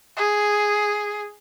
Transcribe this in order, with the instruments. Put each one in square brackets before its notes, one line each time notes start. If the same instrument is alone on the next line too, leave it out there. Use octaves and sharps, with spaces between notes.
[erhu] G#4